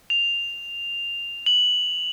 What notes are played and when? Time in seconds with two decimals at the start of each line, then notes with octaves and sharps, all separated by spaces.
0.10 F7
1.46 F#7